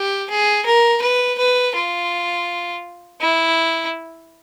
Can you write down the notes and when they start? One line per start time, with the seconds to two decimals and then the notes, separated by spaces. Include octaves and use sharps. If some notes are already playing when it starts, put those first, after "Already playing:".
Already playing: G4
0.30 G#4
0.66 A#4
1.02 B4
1.38 B4
1.75 F4
3.21 E4